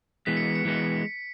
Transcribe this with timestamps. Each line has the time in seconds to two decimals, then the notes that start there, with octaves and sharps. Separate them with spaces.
0.26 E3 G#3 B3 B6
0.37 C#7
0.55 C#7
0.65 E3 G#3 B3